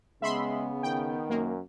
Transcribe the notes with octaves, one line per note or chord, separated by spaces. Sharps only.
C#3 G#3 B3 E5 B5 C6
D#3 G5
F#2 A#3